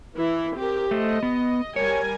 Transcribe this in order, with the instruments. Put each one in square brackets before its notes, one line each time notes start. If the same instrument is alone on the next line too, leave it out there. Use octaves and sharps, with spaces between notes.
[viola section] E3 E4
C4 G4 A#4
[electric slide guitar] A3 C5 [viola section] D#5
[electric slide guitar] B3
[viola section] G3 A#4 G#5 [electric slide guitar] C#5